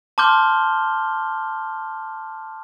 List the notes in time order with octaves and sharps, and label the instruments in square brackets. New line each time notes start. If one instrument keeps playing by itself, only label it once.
[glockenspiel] A5 C6 D6 F6 G6 G7